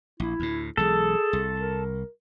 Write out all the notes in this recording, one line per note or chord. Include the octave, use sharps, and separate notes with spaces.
A#1 E4
D2 A2
B1 E3 G#3 G#4 A4
C2
A#4